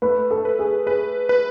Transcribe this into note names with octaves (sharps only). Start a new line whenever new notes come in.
A3 B4
A4
B4
G#4
G#4 B4
B4